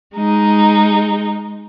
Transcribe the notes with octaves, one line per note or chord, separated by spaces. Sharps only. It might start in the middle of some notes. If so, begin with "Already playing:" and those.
G#3 D#4